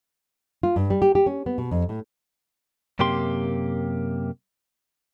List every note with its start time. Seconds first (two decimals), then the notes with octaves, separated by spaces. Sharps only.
0.63 F4
0.76 G2
0.90 G3
1.02 G4
1.15 G4
1.26 C#4
1.46 B3
1.58 B2
1.71 F2
1.89 A2
2.99 F#2 C3 A#3 G4 C6